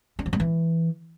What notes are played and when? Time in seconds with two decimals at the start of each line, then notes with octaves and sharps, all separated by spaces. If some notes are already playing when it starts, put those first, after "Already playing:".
0.19 D4
0.26 F3
0.33 G3
0.40 E3